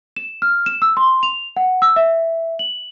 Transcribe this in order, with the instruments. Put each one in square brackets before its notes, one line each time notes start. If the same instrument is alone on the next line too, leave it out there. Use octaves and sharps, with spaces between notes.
[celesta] E7
F6
E7
E6
C6
F7
F#5
E6
E5
F#7